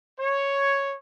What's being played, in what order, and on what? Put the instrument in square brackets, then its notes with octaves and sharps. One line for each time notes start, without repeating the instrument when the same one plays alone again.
[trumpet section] C#5